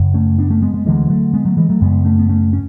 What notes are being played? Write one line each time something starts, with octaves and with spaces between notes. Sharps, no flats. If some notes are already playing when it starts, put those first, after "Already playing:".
Already playing: F#2 C#3
A3 C#4
B3 D4
A3 C#4
G#3 B3
G#3 B3
D2 D3 E3 G#3
F#3 A3
G#3 B3
F#3 A3
E3 G#3
F#3 A3
F#2 C#3 G#3 B3
A3 C#4
B3
A3 C#4
C#4